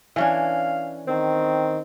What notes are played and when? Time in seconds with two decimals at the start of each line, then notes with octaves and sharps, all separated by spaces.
0.16 E3 C#4 D4 F5
1.08 D#3 C4